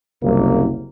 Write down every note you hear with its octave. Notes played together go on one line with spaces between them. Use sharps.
F#1 C2 A#3